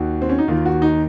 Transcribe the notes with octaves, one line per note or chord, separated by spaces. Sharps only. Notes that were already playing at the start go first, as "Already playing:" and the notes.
Already playing: D#2 D#3 F#4
C4
C#4
D#4
D#2 D#3 F4
F#4
D#4